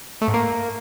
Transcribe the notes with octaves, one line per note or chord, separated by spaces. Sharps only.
A3
G#2
A#3